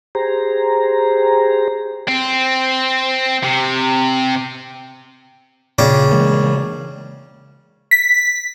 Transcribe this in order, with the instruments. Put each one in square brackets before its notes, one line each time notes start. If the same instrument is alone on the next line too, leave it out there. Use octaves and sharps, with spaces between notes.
[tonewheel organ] G4 G#4 C5 A#5
[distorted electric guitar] C4
C3
[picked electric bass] A#2 [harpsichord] C#3 D4 G5
[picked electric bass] E3 G#3 A#3
[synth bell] B6